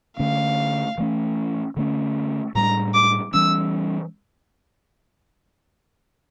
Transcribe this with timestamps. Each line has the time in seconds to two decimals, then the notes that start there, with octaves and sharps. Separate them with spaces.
0.19 D3 A3 C#4 F5
0.98 E3 A3 C#4
1.77 D3 A3 C#4
2.55 A2 G3 D4 A#5
2.94 D6
3.34 E3 G3 C#4 E6